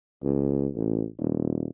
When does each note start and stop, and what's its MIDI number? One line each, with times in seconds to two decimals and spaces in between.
0.23 0.67 37
0.74 1.04 33
1.19 1.67 27